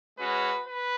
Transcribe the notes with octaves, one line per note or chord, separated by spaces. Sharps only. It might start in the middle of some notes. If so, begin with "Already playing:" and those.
G#3 C#4 F#4 B4
B4